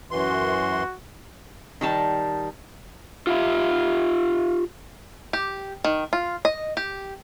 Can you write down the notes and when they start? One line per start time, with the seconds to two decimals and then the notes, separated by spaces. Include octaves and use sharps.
0.11 F#2 E3 F#4 C6
1.81 D#3 G3 A5
3.27 F4 G4 E5 F5
5.33 G4
5.85 D#3
6.13 F4
6.45 D#5
6.77 G4